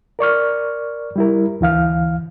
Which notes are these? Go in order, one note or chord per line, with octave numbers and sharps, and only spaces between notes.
A#4 D5 C#6 F6
G3 E4 A#4
D2 E3 F5 F6